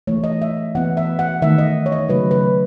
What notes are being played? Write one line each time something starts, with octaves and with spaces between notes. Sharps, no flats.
E3 A3 C#5
D#5
E5
E3 B3 F#5
E5
F#5
D#3 A3 E5
D#5
C#5
D#5
C#3 F#3 A3 B4
B4